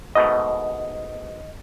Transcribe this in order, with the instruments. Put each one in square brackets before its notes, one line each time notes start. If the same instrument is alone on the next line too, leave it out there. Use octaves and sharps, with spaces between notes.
[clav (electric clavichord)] G#2 B2 A3 [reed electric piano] D#5